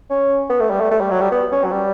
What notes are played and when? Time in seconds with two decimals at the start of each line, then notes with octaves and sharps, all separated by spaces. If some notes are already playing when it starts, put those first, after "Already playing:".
0.10 C#4
0.50 B3
0.60 A3
0.70 G3
0.81 A3
0.91 A3
1.01 G3
1.11 F#3
1.21 G3
1.32 B3
1.52 C#4
1.64 F#3
1.72 G3